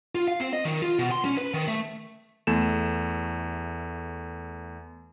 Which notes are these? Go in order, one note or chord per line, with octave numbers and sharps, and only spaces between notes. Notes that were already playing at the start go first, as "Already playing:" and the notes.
F4
F5
C4
D#5
D#3
F4
B2
C6
C#4
B4
D#3
A3
E2 A3 E7